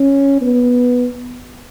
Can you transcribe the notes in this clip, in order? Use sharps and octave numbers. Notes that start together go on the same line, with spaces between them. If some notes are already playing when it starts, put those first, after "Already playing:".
Already playing: C#4
B3